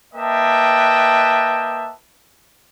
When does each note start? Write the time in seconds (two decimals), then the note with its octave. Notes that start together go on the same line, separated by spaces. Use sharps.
0.14 A#3 B4 D#5 E5 G5 A5